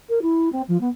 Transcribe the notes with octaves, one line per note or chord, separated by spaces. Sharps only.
A#4
E4
C4
F3
B3